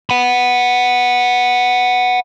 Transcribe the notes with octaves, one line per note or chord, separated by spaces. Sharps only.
F#5 B5